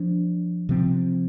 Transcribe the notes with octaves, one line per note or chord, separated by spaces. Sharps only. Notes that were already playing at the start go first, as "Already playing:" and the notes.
Already playing: F3 D4
C3 F3 C4